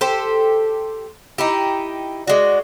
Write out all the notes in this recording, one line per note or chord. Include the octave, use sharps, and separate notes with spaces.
G4 A4 C5
D#4 E4 G4
G#3 F#4 D5